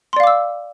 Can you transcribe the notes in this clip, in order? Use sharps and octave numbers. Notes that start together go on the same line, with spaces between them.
D5 F5 C6 D6 E6